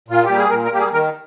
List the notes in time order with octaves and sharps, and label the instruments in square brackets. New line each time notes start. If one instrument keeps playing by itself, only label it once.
[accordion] A#2 F4
G4
G3 A#3
G#4
A#2 A#4
A#4
G3 A#3 G4
G#4
D#3 A#4